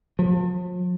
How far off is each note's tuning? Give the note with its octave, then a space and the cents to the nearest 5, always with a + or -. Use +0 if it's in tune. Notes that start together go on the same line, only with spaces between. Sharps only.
F3 +40